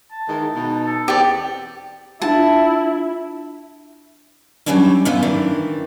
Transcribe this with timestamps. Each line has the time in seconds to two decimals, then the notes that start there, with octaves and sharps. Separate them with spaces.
0.11 A5
0.29 D#3 E3 G#3
0.56 B2 D#4
0.86 A4
1.08 E2 B3 C4 G4 D5
2.22 D4 E4 F4 A5
4.66 F#3 G3 A3 C#4 D4 E4
5.05 F#2 A2 E3 B3 E4 F4
5.23 D#3 E3 D4